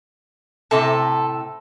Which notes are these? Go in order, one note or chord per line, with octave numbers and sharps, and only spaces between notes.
A2 C3 A3 A4